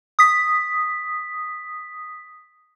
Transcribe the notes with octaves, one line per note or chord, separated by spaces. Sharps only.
D#6 B6